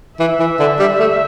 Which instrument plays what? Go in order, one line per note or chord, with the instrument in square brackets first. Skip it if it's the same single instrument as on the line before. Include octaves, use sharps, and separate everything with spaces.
[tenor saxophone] E3 [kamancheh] E5
[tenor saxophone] E3
D3
G3
A3